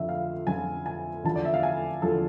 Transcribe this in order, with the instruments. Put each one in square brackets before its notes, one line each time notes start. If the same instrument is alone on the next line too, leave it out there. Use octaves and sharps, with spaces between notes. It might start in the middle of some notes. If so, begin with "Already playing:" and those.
Already playing: [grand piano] F2 D3 F3 E5
F5
F2 D3 F3 G#5
G#5
E2 D3 F3 A5
D5
E5
F5
G#5
E2 D3 F3 A4